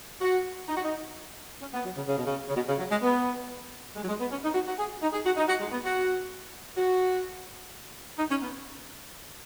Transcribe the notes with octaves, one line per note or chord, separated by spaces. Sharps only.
F#4
D#4
F#4
D#4
C#4
B3
F#3
C#3
C#3
B2
C#3
C#3
B2
C#3
F#3
G#3
B3
G#3
F#3
G#3
B3
C#4
D#4
F#4
F#4
G#4
D#4
G#4
F#4
D#4
F#4
G#3
B3
F#4
F#4
D#4
C#4
B3